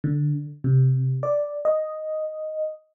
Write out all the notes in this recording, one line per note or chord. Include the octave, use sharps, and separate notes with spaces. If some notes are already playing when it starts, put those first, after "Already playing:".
D3
C3
D5
D#5